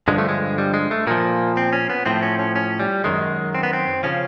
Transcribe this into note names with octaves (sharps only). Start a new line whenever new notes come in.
G2 D3 F3 G#3
A3
G#3
G3
G#3
A3
A#2 F3 A#3
C4
C#4
B3
A2 F3 C4
C#4
C#4
C#4
G3
F#2 D#3 G#3
C4
B3
C4
C#3 F3 C#4